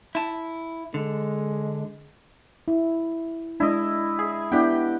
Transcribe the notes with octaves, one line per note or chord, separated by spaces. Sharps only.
E4 A5
D3 G#3
E4
G#3 D4 E4 D#5
G#4
B3 D4 E4 G4 F#5 G5